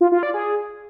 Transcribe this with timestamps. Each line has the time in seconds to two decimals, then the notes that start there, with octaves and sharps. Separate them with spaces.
0.01 F4
0.12 F4
0.23 D5
0.34 G#4